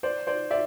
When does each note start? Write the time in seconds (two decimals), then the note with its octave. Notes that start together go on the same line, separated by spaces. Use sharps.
0.03 C5 D5
0.27 C5 D5
0.51 D5 E5